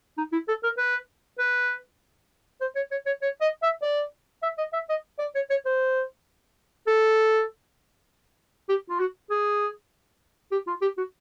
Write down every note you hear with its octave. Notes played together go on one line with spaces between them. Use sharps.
D#4
E4
A4
A#4
B4
B4
C5
C#5
C#5
C#5
C#5
D#5
E5
D5
E5
D#5
E5
D#5
D5
C#5
C#5
C5
A4
G4
F4
F#4
G#4
G4
F4
G4
F#4